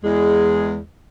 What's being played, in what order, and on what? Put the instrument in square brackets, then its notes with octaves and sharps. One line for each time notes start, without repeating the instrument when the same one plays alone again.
[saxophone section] E2 G#3